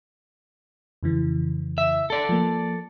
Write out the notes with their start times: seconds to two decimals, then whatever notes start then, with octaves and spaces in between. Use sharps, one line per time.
1.03 F2 C#3 E3
1.78 E5
2.10 A4 D5
2.29 F3 A#3